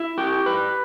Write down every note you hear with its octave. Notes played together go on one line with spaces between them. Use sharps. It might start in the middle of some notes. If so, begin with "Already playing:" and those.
Already playing: E4
G4
B4